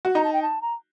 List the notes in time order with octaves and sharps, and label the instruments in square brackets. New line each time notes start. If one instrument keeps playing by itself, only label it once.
[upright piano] F#4
[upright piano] D#4 [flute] A#5
[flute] A5
G5
A5
A#5